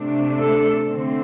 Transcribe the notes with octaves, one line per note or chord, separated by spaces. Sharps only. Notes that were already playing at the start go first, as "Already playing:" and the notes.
Already playing: C3 A3 D4
A4
D3 A3 C4